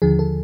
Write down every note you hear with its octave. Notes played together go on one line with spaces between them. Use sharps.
D#2 D3 F3 G#4
A4